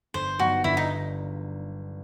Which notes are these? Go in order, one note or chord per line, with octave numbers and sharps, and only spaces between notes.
G1 C5
G2 F#3 B3 D#4 F#4
G1 E4
D#4